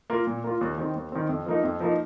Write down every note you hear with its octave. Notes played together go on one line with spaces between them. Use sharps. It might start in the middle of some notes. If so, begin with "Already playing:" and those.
A#3 F4
A#2
A#3 F4
D#2
D#3 C4
D#2
D#3 C4
F2
F3 A#3 D#4
F2
F3 A#3 D#4